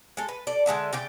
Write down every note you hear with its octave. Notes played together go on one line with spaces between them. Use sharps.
G#3 A4
B4
A4 D5
D3 G#3 E5 A5
C#3 D5 G5